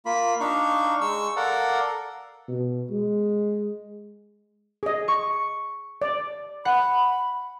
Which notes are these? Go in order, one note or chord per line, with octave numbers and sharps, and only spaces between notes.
A#3 F4 B5
D4 D#4 F5 C#6
G#3 C#6 E6
A4 A#4 D5 F5 F#5
B2
G#3
G#4 D#5
C#6
D5
F#5 B5